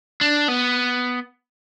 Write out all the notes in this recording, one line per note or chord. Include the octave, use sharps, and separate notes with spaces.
D4
B3